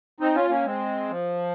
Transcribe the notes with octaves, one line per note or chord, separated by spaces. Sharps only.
C4 D#4
C#4 F4
A#3 C#4
G#3 C4
F3